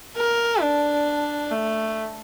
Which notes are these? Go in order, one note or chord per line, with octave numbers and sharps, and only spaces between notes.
A#4
D4
A3